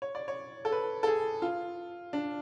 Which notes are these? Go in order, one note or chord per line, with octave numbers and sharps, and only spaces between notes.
C#5
D5
C#5
A4
B4
A4
G#4
F4
D4